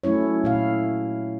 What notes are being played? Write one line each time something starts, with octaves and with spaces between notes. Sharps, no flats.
F#3 A3 C#4 E4 C#5
A#2 E4 F5